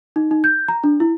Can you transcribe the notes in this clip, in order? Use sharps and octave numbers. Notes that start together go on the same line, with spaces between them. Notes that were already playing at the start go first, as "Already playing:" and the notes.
D#4
D#4
G6
A#5
D4
E4